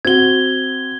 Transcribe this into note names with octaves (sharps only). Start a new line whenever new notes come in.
C4 F#4 G#6 G7